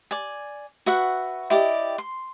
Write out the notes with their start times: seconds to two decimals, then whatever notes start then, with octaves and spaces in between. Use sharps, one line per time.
0.11 D5 G#5
0.86 F#4 B4 E5 F#5
1.50 E4 G4 D5 D#5
1.98 C6